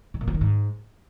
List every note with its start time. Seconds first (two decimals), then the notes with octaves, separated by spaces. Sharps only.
0.14 C3
0.21 A#2
0.28 F3
0.34 D#3
0.41 G#2